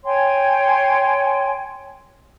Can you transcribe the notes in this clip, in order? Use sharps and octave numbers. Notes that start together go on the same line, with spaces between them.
C#5 G5 G#5 C6